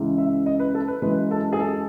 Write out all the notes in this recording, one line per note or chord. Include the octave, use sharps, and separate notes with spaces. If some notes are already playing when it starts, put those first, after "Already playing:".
Already playing: C#2 C#3 E3 G#3
E5
D#5
B4
A4
B4
F#2 E3 G#3 B4
A4
G#4
A4